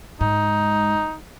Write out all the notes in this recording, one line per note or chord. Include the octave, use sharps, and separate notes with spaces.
G#2 D#4